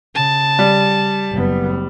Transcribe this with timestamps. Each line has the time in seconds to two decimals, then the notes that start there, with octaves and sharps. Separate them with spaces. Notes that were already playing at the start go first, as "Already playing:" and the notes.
0.15 C#3 A5
0.59 G3
1.31 F#1 B3